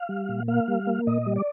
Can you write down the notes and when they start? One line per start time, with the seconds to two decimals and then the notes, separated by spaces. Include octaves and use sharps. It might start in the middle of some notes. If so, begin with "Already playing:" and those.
Already playing: F5
0.09 G3
0.29 A#2
0.48 A#3 F5
0.68 G3
0.87 A#3
1.07 A#2 D#5
1.26 G3
1.36 D5